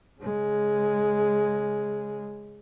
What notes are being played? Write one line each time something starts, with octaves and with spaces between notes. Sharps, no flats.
C#3 G#3